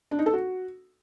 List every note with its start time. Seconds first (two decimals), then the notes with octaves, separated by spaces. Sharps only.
0.11 D4
0.19 D#4
0.26 A4
0.33 F#4